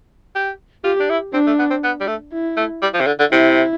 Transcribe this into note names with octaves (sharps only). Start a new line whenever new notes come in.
G4
F4 G4
D4
E4
C4 D4
A3
B3
C4
B3
G3
A3
E4
A3
G3
F3
C3
D3
D3
C3 E4